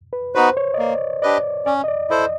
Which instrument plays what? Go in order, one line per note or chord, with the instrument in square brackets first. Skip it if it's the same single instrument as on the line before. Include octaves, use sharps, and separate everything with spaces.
[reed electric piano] B4
[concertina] B3 D#4 F#4 B4 [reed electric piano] C5
[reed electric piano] C#5
D#5
[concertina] A#3 [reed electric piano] D5
[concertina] D4 G4 B4 D#5 [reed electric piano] D5
[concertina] C#4 [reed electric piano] D5
[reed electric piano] D#5
D5
[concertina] E4 A4 C5 [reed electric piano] D#5